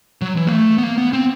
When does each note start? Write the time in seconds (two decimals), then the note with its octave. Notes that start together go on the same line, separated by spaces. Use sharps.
0.22 F#3
0.37 E3
0.47 A#3
0.52 A3
0.78 B3
0.83 A#3
0.98 B3
1.13 C4